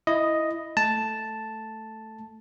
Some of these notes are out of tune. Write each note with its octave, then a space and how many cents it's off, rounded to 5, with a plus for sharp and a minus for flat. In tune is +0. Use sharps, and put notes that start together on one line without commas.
E4 +0 D#5 +0
A3 +0 A5 +0